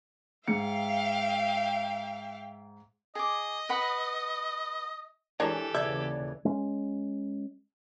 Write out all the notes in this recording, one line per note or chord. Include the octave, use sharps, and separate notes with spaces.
G#2 E5 F5 G5 C#7
G#4 D#5 D6
B4 F#5 B5
E3 G#3 D4 G4 A4 A#4 C#5
D#2 C#3 E3 D5 E5 G#6
G#3 C#4